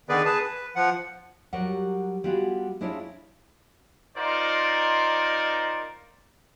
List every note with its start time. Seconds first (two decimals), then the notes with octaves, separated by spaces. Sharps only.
0.09 D3 D#3 B3 G#4 B4 D5
0.25 G#4 B4 A5
0.41 B4
0.76 F3 F#5
1.53 F#3 G3 G4 A#4 F#5
2.24 G3 B3 F4 F#4 G#4
2.81 G#3 D4 E4 F4 C#5
4.17 D#4 F4 A#4 C5 D5